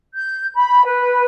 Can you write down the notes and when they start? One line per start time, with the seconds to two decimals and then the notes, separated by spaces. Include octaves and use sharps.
0.14 G6
0.55 B5
0.85 B4